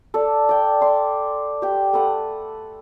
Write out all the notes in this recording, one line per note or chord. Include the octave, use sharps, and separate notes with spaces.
A4 D5
D5 G5
D5 C6 D6
G4 G5
A3 A4 B4 F#5